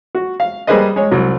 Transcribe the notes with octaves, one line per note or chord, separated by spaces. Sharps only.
F#4
F5
G3 A#3 G#4 B4 C5 D#5
G#3 C#5
C2 F#3